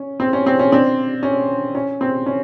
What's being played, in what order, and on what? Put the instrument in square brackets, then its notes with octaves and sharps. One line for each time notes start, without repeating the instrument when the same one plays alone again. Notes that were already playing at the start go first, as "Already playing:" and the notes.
Already playing: [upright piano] C#4
C4
C#4
C4
C#4
C4 D4
C#4
C#4
C4
C#4